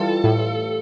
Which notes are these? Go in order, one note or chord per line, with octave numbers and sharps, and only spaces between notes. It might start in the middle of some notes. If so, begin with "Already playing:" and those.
Already playing: E3 G3 F4 A4
A2